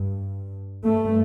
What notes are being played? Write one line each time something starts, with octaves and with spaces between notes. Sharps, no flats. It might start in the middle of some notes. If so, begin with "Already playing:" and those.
Already playing: G2
G2 A3